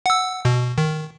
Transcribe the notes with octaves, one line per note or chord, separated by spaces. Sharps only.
F#5 E6
B2
D#3